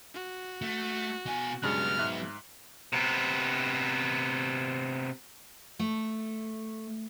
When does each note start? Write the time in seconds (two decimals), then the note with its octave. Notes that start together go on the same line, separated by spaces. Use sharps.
0.14 F#4
0.62 A3
1.27 B2 G#5
1.63 G2 C#3 F#3 G#3 B3 F6
1.99 G#2 E5 F#6
2.93 C3 B3
5.79 A3